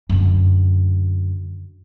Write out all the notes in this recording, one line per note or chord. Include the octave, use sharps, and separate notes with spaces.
F#2 D3